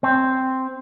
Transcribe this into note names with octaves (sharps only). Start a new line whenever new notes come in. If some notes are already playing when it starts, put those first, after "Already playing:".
C4